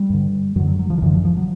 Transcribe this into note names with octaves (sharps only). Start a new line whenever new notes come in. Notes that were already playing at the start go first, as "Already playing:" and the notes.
Already playing: G3
G2 D3
F#2 D3 F#3
F#3
F#3
F3
D#3
F#2 D3 E3
F3
F3
F#3